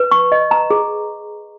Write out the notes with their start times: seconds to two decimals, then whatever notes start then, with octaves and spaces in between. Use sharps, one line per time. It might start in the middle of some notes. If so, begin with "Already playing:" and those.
Already playing: B4
0.11 C#6
0.32 D#5
0.51 A#5
0.70 G#4